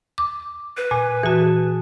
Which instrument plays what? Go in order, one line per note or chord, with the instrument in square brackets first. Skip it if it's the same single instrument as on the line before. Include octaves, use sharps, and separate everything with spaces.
[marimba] D6
[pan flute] B4
[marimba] A#2 [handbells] G#5
[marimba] E3 F#4 [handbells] G#4 A5